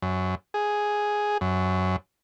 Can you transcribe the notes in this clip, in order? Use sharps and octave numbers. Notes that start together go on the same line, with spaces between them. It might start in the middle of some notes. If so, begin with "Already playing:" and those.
F#2
G#4
F#2